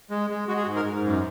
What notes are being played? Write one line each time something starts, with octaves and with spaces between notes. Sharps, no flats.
G#3
G#3
G#3 F#4
G#4
F#4
G#2
A#4
G#2
F#2